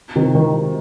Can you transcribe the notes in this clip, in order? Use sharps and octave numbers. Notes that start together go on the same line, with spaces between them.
C3 D#3
D#3